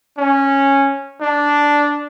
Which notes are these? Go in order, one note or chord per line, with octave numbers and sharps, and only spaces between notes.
C#4
D4